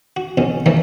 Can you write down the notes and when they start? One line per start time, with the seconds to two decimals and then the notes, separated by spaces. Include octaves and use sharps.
0.17 F#4
0.37 B1 F2 B2 C#4
0.66 C3 D#3 E3 G3 A3 A#3